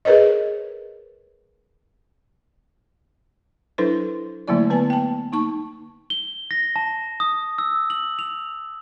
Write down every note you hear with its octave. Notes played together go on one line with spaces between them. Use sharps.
G#4 A#4 B4 C#5 D#5
F#3 D4 E4 A4 B4 C5
D3 F#3 A3 A#3 E4 D5
B3 B4 G#5 A5
G5 A5
A#3 D#4 A5 C#6
G7
A#6
A5
D#6
E6
F#7
F7